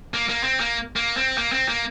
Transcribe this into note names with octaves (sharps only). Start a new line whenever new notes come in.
A#3
A#3
C4
A#3
A#3
C4
A#3
C4
A#3